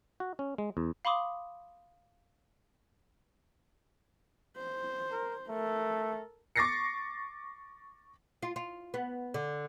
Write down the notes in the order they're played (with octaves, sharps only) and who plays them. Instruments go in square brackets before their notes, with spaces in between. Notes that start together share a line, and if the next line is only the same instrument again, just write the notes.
[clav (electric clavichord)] F#4
C#4
G#3
E2
[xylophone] F5 B5 C6 D6 D#6
[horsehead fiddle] C5
[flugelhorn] A#4
[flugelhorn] A3 [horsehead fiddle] A4 A#4
[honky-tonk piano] C#6 D6 A6 A#6 C7 C#7
[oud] F4
F4
B3
D3